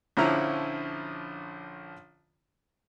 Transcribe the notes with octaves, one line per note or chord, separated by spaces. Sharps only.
A#1 D3 F3 C#4 E4 A#5